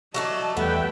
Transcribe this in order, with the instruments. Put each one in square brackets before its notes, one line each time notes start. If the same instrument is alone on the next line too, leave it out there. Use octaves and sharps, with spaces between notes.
[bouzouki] F#3 A3 D5 [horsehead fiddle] D#5 A5
[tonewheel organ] E2 F#5 E6 [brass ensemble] G3 A3 [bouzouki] B3 [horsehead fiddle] B4 G5